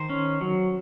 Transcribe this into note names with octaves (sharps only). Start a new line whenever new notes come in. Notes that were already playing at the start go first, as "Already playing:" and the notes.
Already playing: D#3 C5
C#4
F#3